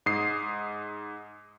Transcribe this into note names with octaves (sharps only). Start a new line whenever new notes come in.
G#2 D#6 C7